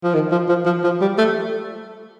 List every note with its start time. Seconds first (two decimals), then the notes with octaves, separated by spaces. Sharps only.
0.03 F3
0.14 D#3
0.32 F3
0.49 F3
0.66 F3
0.83 F3
1.01 G3
1.18 A3